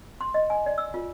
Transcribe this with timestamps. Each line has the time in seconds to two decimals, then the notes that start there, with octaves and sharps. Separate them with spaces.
0.21 C6
0.34 D#5
0.50 G#5
0.66 D5
0.78 E6
0.94 F4